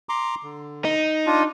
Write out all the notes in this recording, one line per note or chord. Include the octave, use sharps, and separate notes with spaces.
A#5 C6 D6
D3
D#4
D4 F4